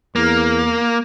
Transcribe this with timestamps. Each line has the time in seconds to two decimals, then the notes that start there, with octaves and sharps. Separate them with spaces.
0.16 E2 A#3